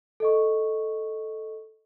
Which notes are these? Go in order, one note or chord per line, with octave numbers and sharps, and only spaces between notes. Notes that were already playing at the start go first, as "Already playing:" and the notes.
A4 D#5 C#6